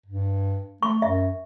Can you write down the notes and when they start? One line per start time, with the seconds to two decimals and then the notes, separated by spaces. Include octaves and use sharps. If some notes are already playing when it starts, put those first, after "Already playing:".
0.06 G2
0.83 A3 C#6
1.02 F#2 E5